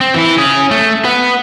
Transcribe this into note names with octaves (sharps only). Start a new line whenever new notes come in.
C4
E3 E4
C#4 G#4
A3
B4 F#5